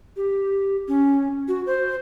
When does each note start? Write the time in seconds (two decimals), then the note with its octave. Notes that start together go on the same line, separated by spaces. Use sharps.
0.17 G4
0.88 C#4
1.48 F#4
1.66 C5